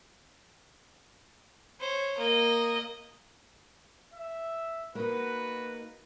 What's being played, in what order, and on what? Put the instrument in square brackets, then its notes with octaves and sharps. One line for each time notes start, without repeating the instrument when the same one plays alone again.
[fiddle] C5 C#5
A#3 D#5
[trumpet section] E5
[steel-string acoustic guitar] A#3 D#4 [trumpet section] B3 F#4 B4